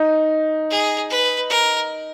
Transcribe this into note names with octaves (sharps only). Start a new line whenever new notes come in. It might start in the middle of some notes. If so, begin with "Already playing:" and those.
Already playing: D#4
G#4
B4
A#4